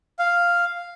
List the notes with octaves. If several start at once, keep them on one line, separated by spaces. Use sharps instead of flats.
F5